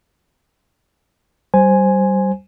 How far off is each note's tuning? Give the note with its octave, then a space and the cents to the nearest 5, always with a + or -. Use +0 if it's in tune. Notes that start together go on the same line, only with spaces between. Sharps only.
G3 -25 C5 +0 G#5 +0